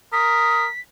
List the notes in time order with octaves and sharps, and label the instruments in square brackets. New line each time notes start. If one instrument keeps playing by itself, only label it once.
[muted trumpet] A#4 [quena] D#6 [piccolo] B6